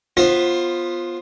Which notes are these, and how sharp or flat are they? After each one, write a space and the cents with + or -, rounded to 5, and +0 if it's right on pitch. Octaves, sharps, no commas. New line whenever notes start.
B3 -5 F4 +0 C5 +25